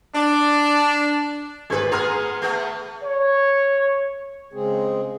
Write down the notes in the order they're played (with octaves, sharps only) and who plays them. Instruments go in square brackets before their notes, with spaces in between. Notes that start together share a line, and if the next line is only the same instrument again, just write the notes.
[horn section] D4
[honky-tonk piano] G#1 G#4 [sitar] C4 B4
[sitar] B3 G#4 [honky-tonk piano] A#5 C6 F6
[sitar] A3 B3
[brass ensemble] C#5
[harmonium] C#3 G#3 C4 G#4